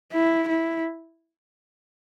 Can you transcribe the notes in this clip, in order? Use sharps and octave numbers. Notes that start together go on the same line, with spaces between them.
E4
E4